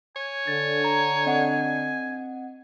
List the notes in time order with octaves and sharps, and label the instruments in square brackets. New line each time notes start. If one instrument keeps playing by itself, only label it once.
[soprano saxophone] C#5 [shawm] G#5
[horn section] D3 [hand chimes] A6
[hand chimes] A#5
C4 D#5 F#5